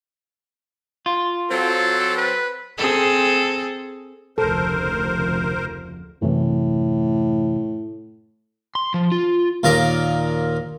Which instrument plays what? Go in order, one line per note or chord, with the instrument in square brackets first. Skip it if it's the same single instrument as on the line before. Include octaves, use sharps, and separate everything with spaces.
[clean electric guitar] F4
[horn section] F#3 C4 [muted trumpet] A4
[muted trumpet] B4
[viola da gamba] C4 G#4 A4
[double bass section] F1 D2 C#3 [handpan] A4 [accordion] A#4 C5
[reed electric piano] F#2 C3 E3 [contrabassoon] A2
[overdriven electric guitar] C6
F3
F4
[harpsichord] D#2 A#2 F4 A#4 D6